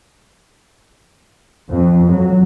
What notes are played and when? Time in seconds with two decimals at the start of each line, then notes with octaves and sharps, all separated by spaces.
1.71 F2
2.12 F#3